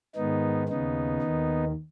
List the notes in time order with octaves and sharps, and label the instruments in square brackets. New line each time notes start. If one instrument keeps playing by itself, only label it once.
[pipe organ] G#2 D#3 B3 D#4
D#2 C#3 B3 D#4
D#2 D#3